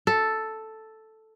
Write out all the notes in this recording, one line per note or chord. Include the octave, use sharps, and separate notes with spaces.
A4